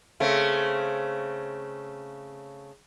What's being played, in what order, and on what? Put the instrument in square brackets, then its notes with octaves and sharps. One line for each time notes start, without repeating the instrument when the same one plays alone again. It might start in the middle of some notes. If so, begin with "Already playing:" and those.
[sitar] C#3 A3 C4